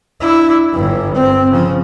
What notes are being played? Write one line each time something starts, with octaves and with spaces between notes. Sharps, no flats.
D4 E4
G1 G2
C4
C#3 F3